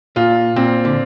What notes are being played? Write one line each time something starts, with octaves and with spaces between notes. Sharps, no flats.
A#2 F4
A#2 C4
D3